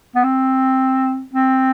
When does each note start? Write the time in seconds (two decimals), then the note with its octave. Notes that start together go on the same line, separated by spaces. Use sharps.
0.16 B3
0.24 C4
1.34 C4